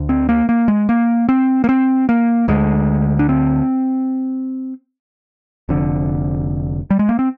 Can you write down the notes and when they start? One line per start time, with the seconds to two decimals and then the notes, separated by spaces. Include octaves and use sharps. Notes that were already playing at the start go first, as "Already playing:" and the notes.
Already playing: D2 D3
0.09 C4
0.29 A#3
0.49 A#3
0.68 G#3
0.89 A#3
1.29 C4
1.64 A#3
1.69 C4
2.09 A#3
2.48 D2 D3 G#3
3.19 D4
3.29 C4
5.69 F1 F2 D3
6.90 G3
6.99 G#3
7.09 A#3
7.19 C4